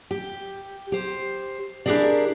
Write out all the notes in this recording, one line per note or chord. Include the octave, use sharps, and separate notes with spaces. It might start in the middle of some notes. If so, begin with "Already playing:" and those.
G4
G4 C5
D4 E4 G4 G#4 A#4 D5